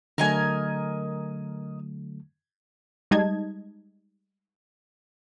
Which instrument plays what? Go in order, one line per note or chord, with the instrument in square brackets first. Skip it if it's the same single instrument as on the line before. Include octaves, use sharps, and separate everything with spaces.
[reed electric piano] D3 F#3 A3 [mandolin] A#4 D#5 G#5
[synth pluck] G3 G#3 D#4 D#5 A5 G#6